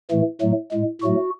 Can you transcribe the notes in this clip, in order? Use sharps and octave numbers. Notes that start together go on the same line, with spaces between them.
A2 E3 A3
A2 F#3 A3
A2 G#3
A2 F#3 A3 F#4